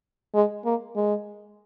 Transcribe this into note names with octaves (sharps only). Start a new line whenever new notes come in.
G#3
A#3
G#3